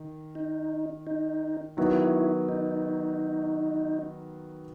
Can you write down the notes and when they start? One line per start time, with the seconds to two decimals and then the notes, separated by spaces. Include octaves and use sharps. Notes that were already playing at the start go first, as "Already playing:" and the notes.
Already playing: D#3
0.35 D#4
1.07 D#4
1.77 D#3 F#3 B3 E4 F#4
2.49 D#4